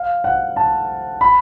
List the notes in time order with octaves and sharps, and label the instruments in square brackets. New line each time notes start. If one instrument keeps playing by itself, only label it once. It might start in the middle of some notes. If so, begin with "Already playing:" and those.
Already playing: [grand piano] F5
F#5
A5
B5